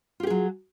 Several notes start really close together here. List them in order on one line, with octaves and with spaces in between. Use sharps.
F4 G4 G#4 F#3